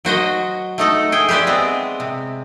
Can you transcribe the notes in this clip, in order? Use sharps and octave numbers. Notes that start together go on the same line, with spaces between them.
F#3 F#4 C5 D#5
A3 D#4 A4
G#4 G5
G4 B4 C5 D5 E5
G#3 B3 C4
C3